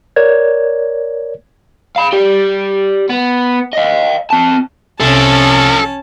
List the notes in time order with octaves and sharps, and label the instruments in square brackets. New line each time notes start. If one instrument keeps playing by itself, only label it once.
[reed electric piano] A#4 C#5 D5 G#6
[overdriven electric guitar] F5 B5
G4 D5
B3
D#5 F5
C4 A5
[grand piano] C2 [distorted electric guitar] F3 D4 [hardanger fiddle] C#4 A5 [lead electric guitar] A4